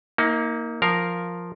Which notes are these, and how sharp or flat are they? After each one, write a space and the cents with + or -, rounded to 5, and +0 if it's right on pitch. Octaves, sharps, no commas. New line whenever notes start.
A#3 +0 D#4 +40
F3 +0 A#4 +0 F5 +0